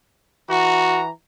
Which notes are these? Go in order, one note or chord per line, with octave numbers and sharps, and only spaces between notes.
E3 F#4 A#5